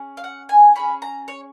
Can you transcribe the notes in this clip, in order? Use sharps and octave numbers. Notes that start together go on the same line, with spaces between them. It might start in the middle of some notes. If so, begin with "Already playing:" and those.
Already playing: C#4 G#4
F5
F#5
G#5
C#4 F4 G#4 B5
A#5
C#5